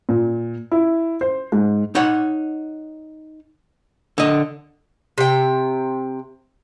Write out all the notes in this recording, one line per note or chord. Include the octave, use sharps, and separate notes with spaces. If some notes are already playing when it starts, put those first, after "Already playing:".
A#2
E4
C5
G#2
D#4 C#5 F#5
D3 D#5
C3 G5